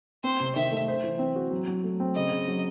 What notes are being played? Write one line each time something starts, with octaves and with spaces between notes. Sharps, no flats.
C4 C5
C3
D#3 E5
A3
C5
E3
C4
F#4
F#3
F#3
A3
C4
C#3 D#5
C#3
F#3